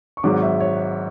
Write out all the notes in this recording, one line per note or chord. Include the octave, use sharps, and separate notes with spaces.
C#6
G#1 G#2 F#3 D6
E5
C#5